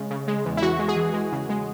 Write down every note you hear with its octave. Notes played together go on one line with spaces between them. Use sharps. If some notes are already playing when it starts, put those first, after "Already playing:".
Already playing: C#3 G#3
C#3
G#3
E2
E4
E3 F#4
G#3
G#4
E3
G#3
C#3
G#3